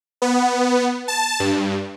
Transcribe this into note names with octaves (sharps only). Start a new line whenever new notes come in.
B3
A5
G2